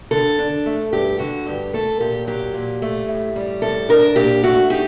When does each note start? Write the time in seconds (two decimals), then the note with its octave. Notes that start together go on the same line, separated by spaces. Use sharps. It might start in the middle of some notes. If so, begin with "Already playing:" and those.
0.11 D3 A4
0.39 D4
0.66 A3
0.92 G2 G4
1.19 D3 F#4
1.46 G2 G4
1.73 A3 A4
2.00 A#2 G4
2.27 F#3 G4
2.54 A#2
2.82 A3
3.08 A2
3.36 G3
3.62 A2 A4
3.89 D4 A#4
4.16 A#2 G4
4.43 A3 F#4
4.70 D#4 G4